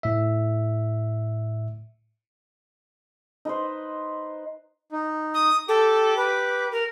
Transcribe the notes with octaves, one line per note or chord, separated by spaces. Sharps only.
A2 E5
D#4 B4 C5
D#4
D#6
G4 A4 D6
B4
A#4